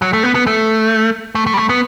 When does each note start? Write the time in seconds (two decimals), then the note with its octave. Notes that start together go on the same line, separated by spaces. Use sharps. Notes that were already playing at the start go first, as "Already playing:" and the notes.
0.02 F#3
0.13 A3
0.23 B3
0.35 B3
0.47 A3
1.35 A3
1.46 A3
1.54 G3
1.57 A3
1.69 B3